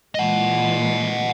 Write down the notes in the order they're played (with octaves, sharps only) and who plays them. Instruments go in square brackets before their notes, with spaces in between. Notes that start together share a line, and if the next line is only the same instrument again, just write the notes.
[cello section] A#2 E3 G#3 [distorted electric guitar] D#5 F#5